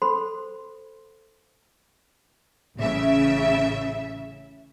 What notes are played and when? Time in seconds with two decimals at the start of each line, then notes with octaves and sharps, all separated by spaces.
0.02 A4 C5 B5 C6
2.77 A1 C#3 E5